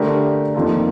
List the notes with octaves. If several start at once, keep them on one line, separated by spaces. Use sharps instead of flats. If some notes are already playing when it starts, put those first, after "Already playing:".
Already playing: D3 A3 D4 G4 A#4
F2 D#3 A#3 F4 A4